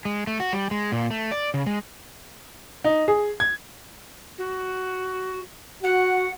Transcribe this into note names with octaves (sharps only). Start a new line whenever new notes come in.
G#3
A3
F#4
G3
G#3
A#2
A3
D5
C#3
G#3
D#4
G#4
G#6
F#4
F#4 F#5